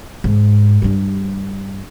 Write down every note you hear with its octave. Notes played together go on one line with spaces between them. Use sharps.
G#2
G2 G3